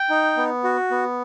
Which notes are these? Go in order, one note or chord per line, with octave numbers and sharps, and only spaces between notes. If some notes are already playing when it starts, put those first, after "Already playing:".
Already playing: G5
D#4
B3
F#4
B3